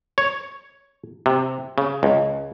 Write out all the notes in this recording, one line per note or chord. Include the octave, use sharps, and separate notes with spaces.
C#5
C3
C#3
C#2